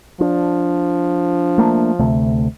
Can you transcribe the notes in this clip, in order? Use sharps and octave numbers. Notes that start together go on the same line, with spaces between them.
F3 D4
A3 A#3 D4
D2 C3 A3